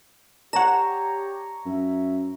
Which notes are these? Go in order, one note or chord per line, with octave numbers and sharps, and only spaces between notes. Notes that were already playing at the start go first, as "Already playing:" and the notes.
G4 C#5 F#5 A#5 E7
F#2 E5